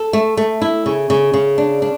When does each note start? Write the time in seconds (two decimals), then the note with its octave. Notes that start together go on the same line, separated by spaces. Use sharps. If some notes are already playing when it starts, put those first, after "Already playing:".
Already playing: A4
0.13 A3
0.37 A3
0.62 E4
0.86 C#3
1.10 C#3
1.33 C#3
1.58 D4
1.82 D4